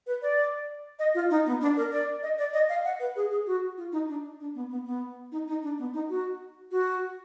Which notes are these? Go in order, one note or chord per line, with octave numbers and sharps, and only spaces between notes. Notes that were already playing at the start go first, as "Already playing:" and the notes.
B4
D5
D#5
F4
D#4
B3
D4
A#4
D5
D#5
D5
D#5
F5
F#5
B4
G#4
G#4
F#4
F4
D#4
D4
D4
B3
B3
B3
D#4
D#4
D4
B3
D#4
F#4
F#4